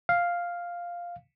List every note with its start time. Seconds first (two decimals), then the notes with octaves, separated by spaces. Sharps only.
0.09 F5